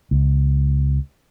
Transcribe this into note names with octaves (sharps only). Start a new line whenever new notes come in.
C#2